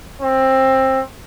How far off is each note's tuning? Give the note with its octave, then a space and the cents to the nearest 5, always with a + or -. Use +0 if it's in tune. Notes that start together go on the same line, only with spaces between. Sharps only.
C4 +20